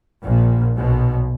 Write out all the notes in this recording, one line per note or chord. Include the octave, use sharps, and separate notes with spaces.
A#1 A#2
B1 B2